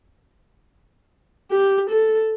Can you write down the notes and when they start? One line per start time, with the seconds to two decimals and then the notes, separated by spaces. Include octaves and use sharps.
1.51 G4
1.90 A4